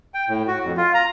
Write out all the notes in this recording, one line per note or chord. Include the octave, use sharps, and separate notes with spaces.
G5
A2
F#4
F2
F4
A#5